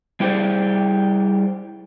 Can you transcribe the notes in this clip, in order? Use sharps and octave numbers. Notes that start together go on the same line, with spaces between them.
G3 E4 G4 G#4 C5 D5